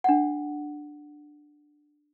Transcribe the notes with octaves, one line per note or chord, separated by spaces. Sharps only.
D4 F#5